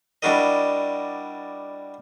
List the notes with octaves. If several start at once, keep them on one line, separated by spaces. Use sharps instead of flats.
G3 D4 E4 F#4 A#4 D#5